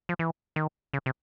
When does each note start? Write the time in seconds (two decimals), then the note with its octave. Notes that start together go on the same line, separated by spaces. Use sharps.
0.09 F3
0.19 E3
0.56 D#3
0.93 C#3
1.06 C3